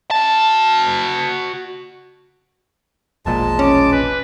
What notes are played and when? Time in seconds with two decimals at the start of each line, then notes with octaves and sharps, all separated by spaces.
0.11 F#4 A5
3.26 E1 A#1 A#2 G#3 A5
3.59 C#4 D6
3.92 B4